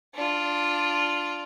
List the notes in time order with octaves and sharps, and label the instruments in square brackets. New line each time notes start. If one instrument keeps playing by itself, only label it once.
[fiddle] D4 F4